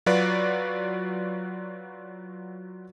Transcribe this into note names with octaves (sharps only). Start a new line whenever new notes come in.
F#3 F4 F#4 B4 D5